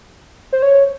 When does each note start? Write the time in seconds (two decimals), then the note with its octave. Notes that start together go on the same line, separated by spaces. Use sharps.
0.53 C5
0.62 C#5